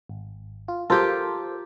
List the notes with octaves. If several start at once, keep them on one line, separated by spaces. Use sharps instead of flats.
G#1
F4
F4 G4 A4 A#4 C5